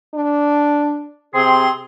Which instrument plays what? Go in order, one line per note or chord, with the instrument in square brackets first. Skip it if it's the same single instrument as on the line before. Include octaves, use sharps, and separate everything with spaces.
[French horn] D4
[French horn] C3 [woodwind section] C4 G#4 C6